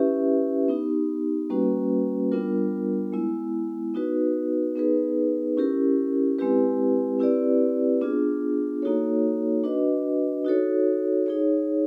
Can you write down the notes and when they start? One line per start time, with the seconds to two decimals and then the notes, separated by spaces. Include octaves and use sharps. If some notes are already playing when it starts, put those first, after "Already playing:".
Already playing: C#4 E4 G4 B4 E5
0.68 B3 D#4 G4
1.50 G3 A#3 C#4 F#4 B4
2.32 G3 B3 D4 F4 A#4
3.13 G#3 B3 E4
3.94 B3 D#4 F#4 B4
4.76 B3 D#4 G#4 B4
5.57 C#4 E4 G4 A#4
6.39 G#3 C4 E4 G4 B4
7.19 C4 E4 G4 B4 D5
8.01 B3 D4 F4 G#4
8.82 A#3 D#4 F#4 A4 C#5
9.64 D4 F#4 B4 D#5
10.45 D#4 F#4 A4 C#5
11.26 D#4 G#4 C#5